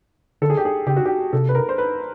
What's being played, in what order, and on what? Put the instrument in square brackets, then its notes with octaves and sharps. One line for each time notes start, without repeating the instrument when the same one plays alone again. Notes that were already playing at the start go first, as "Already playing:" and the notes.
[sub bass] D3 [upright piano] A4
[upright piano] G#4
G4
G#4
[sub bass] C#3 [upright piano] G4
[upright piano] F#4
G4
[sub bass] C3 [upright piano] A4
[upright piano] B4
A#4
C5
B4